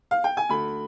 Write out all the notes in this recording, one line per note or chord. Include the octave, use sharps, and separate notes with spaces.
F5
G5
G#5
D2 B5